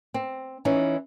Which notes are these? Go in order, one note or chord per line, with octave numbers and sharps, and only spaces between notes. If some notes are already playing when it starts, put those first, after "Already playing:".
C4
E3 C#4 D#4